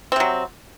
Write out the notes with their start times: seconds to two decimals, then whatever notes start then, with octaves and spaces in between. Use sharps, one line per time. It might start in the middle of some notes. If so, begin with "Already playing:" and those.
0.12 C4
0.16 C3
0.20 F#3